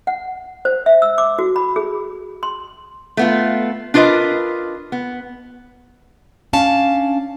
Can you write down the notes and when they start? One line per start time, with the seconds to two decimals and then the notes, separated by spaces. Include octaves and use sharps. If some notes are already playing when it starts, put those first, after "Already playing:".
0.07 F#5
0.65 C5
0.86 E5
1.02 E6
1.18 D6
1.39 F#4
1.56 B5
1.76 G#4
2.43 C6
3.17 A3 B3 F4
3.94 D4 F4 A#4 B4 D#5
4.92 B3
6.53 C#4 D4 F5 A5